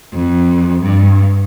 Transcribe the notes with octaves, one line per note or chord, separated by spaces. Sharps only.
F2
G2